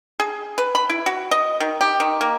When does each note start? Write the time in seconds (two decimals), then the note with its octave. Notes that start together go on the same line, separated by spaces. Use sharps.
0.20 G#4
0.58 B4
0.75 B5
0.90 E4
1.06 F#4
1.31 D#5
1.60 D#3
1.81 G4
2.00 D#3
2.21 A#3